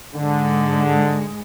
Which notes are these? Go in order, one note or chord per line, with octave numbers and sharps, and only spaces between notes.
G#2 D3 G#3